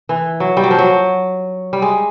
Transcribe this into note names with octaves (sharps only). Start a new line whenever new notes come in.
E3
F#3
G3
F#3
F3
F#3
G3
G#3